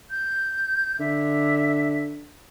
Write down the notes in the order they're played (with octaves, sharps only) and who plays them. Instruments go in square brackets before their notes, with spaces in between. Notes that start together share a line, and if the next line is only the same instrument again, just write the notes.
[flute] G6
[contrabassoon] D3 [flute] E5